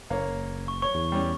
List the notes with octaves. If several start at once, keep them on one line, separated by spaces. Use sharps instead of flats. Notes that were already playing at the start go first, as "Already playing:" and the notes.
F#1 A#3 C#5
C#6
C#5 C#6
E2
G3 C#4